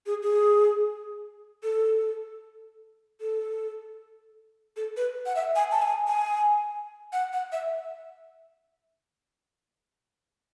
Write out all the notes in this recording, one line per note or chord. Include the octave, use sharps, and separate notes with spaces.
G#4
G#4
A4
A4
A4
B4
F#5
E5
G#5
A5
G#5
G#5
F#5
F#5
E5